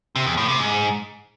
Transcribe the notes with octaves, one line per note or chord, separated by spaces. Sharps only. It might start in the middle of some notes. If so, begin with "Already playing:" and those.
C3
E2
A2
C3
G#2